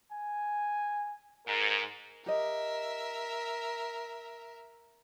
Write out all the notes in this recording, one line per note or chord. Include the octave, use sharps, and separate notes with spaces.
G#5
G#2 A#4
G4 A#4 D#5 E5